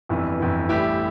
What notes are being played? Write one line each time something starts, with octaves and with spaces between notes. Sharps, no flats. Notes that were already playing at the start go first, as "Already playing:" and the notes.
G1 F2 E3
G1 F2 E3
A1 A2 G3 E4 G4